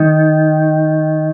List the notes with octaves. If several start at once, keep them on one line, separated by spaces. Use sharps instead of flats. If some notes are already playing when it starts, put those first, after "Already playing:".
Already playing: D#3